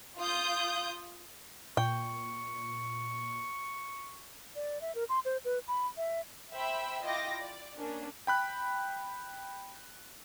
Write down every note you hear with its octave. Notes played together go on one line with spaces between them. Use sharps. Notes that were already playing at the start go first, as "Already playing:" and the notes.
F4 D#6 G6
A#2 G5 C#6
D5
E5
A#4
C6
C5
B4
B5
E5
C5 E5 G5 B5 E6
E4 F4 D#5 G5 D6 A#6
D5
A#3 C#4 D4
G5 B5 F#6